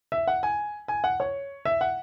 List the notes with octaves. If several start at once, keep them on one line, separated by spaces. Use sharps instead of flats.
E5
F#5
G#5
G#5
F#5
C#5
E5
F#5